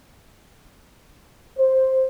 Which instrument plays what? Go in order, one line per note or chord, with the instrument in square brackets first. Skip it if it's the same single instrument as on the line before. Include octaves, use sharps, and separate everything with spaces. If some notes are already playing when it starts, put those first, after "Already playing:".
[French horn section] C5